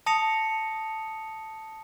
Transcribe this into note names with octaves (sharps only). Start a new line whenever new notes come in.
A5 D#6 A#6 C#7 F7